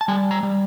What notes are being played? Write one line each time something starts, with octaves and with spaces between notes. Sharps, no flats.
A5
G3 G#5
A#5
G3